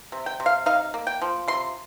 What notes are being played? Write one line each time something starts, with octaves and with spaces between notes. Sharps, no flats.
C3
G5
C3
F5
D#4 F5
A#3
G5
F3
C3 C6